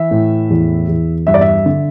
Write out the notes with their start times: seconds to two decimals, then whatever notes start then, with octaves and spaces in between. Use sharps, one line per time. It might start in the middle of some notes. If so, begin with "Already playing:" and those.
Already playing: E3 E5
0.11 A2
0.50 E2
0.88 E2
1.27 G2 E5
1.34 D5
1.41 E5
1.66 D3